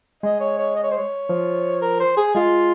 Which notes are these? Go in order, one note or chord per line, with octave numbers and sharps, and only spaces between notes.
G#3 D#5
C#5
C#5
D#5
C#5
C5
C#5
F3
A#4
C5
G#4
G#3 F4